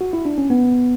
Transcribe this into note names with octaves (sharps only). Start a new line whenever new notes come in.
F#4
E4
D4
C#4
B3